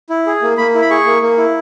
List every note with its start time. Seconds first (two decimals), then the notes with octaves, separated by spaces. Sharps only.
0.10 E4
0.26 G#4
0.42 A#3
0.57 A#3 B5
0.74 E4
0.82 B5
0.90 G#4 C#6
1.06 A#3
1.22 A#3
1.38 E4